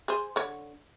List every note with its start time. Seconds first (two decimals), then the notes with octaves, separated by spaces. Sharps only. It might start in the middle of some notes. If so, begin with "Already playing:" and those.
0.08 G#4 C5
0.36 D3 C#5